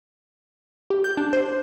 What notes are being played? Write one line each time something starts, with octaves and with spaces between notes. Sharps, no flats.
G4
G6
D4
C5